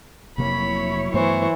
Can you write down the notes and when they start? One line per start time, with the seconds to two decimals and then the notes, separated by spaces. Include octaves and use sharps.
0.38 F1 C3 F#3 A#3 E4 C#5 B5
1.14 G2 E3 A3 B3 C5 C#6